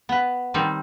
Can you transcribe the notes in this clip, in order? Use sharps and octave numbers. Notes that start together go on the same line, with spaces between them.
B3 B4
D#3 G3 C4